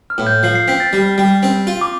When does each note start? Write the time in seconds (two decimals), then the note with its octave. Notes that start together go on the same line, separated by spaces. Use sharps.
0.10 F6
0.18 A2
0.27 G6
0.43 F3 C7
0.55 C7
0.68 C4 B6
0.80 A6
0.93 G3
1.18 G3
1.43 C4
1.67 F4
1.81 D6